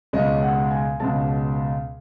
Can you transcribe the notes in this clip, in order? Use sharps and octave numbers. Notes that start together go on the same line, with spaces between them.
C#2 B2 G#3 D#5
F#5
G#5
C#2 B2 G#3 A5